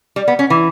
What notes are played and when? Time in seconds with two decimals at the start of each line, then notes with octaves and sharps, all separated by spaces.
0.16 G3
0.28 B3
0.39 C#4
0.50 E3